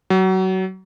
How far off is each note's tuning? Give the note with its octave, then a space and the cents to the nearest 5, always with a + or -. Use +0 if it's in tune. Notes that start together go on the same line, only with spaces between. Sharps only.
F#3 +25